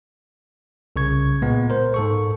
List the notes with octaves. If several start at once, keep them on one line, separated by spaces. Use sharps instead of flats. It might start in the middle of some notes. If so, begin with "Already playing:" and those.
C2 C#3 C#6 G#6
A#2 G#3 B3
A#4 C5
G#2 A4 C#6